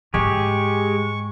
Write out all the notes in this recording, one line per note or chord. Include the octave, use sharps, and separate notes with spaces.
G#2 G#3 G4 G#4 C#6